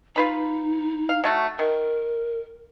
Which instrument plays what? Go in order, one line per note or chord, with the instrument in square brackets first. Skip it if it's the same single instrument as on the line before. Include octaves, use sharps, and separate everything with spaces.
[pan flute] D#4 [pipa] F4 B4 B5
[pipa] F5
F#3 A3 F#4
[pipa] D#3 [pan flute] A#4